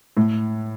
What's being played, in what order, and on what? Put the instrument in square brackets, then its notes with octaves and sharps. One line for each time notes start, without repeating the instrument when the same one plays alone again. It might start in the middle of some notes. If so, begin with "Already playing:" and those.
[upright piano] A2